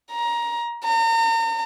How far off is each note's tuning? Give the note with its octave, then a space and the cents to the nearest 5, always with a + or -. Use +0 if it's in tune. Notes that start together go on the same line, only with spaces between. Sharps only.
A#5 +20
A#5 -40